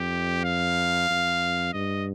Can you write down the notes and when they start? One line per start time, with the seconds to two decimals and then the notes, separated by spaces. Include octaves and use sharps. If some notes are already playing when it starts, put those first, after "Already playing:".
Already playing: F2 G4
0.45 F5
1.10 F2
1.73 G2 D#5